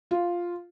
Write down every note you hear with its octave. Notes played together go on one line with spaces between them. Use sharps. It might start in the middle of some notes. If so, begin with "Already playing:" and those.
F4